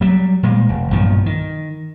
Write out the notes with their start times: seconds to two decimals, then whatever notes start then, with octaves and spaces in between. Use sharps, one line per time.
0.01 F#3 G3
0.43 A#2 G3 G#3
0.69 F1
0.91 B1 G2 A#2 F3
1.26 D#3